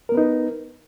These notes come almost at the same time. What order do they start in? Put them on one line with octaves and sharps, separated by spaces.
A#4 B3 B4 D#4